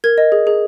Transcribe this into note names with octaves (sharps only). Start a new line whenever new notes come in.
A#4 G#6
D#5
G#4
G#4